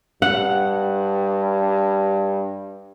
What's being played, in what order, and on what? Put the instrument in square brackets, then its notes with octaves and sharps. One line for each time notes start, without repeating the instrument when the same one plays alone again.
[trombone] G2 [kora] F#5